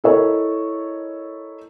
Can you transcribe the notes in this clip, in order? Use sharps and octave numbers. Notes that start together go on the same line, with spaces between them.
E4 A4 A#4 C#5 D#5